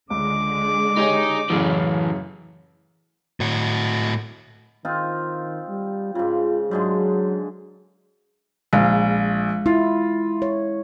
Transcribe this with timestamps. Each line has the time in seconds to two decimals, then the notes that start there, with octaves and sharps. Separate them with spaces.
0.10 C#2 D3 G#3 D6
0.98 D#4 G4 G#4 C#5
1.50 F#2 A2 C#3 E3 C#4
3.40 A2 F#4
4.85 D#3 C4 D#4 F4
5.69 G3
6.15 G#2 C#3 F4
6.71 G#2 D3 F#3 G#3
8.73 A#1 G#3 F5
9.66 E4 F4
10.42 C#5